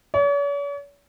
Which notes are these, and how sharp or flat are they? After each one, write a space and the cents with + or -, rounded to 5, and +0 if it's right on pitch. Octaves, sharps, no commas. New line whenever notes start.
C#5 +45